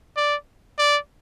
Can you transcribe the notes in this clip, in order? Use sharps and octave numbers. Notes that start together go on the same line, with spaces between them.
D5
D5